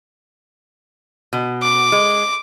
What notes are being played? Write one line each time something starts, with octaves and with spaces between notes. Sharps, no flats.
B2
D6
G#3